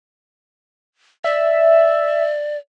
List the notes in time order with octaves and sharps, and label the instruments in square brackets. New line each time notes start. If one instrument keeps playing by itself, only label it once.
[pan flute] D5 [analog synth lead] E5